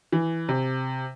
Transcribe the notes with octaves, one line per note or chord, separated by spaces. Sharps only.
E3
C3